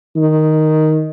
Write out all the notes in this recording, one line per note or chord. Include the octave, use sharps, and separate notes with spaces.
D#3